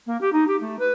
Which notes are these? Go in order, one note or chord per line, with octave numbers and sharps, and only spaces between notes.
A#3
G4
D#4
G4
A3
B4